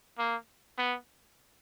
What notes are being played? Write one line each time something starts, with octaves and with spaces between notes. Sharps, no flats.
A#3
B3